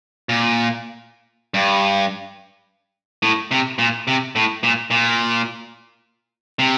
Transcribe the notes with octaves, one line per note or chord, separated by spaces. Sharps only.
A#2
G2
A2
C3
A#2
C3
A2
A#2
A#2
C3